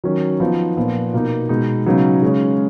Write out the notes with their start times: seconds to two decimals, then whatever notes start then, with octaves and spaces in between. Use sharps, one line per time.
0.04 D#3 F#3 C#4
0.40 F3 B3 D#4
0.77 A#2 F3 B3
1.14 B2 A#3 D#4
1.49 B2 G#3 D#4
1.86 C#3 F#3 B3 D#4
2.22 C#3 G#3 C#4